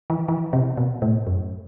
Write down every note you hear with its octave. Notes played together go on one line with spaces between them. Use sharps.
E3
E3
C3
B2
A2
F#2